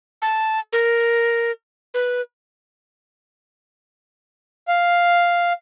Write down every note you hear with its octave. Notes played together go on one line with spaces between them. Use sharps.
A5
A#4
B4
F5